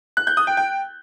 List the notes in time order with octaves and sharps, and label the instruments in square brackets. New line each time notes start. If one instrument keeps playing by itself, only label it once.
[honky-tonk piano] F#6
G6
D#6
G5
G5